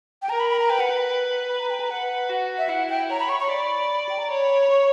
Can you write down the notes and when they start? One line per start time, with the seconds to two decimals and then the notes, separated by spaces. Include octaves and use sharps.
0.22 G5
0.29 A#4 A#5
0.40 B5
0.50 B5
0.60 A#5
0.70 B4 G5
0.80 F#5
0.90 G5
1.49 B5
1.60 A#5
1.70 G5
1.80 A#5
1.90 B4 F#5
2.30 F#4
2.58 E5
2.69 E4 F#5
2.89 G5
3.10 C#5 A#5
3.20 B5
3.29 C#6
3.40 C#6
3.49 D5 B5
4.09 G5
4.19 A#5
4.30 C#5 B5
4.63 B5
4.70 C#6